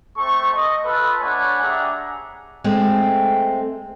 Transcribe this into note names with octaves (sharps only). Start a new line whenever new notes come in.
A3 C4 A4 C#6
D#5
F4 A4 B4
A3 D4 C#5 F#5 G#5 B5
D4 G4 G#4 E5 F#5 A#5
G#3 A3 C4